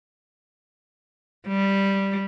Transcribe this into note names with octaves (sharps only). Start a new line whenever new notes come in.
G3